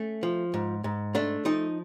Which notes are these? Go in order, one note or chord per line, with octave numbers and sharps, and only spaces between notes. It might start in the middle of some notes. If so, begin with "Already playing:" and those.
Already playing: A3 C#4
F3
G#2
G#2
A3 D4
F3 D#4